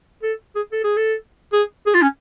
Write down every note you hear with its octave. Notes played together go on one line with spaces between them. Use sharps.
A4
G#4
A4
G#4
A4
G#4
G#4
F4
C#4